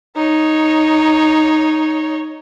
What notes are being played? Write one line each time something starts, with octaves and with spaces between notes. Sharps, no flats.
D#4 C#5